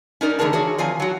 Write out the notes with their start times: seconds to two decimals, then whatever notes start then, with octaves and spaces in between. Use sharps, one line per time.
0.21 C#4 D#4 A#4 D5
0.39 D3 E3 A3 G#4 A#4 A5
0.53 F#4 G#4 C#5 D5 E5
0.78 D#3 F3 C4 G#5
1.00 F#3 F#4